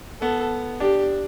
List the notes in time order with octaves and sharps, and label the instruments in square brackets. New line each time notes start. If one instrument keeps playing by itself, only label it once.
[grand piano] B3 [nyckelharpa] A4
[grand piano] D4 [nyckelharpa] G4